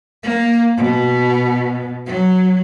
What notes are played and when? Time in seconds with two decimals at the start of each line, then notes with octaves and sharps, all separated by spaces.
0.23 A#3
0.78 B2
2.07 F#3